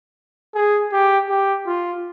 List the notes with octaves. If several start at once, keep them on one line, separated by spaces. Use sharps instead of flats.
G#4
G4
G4
F4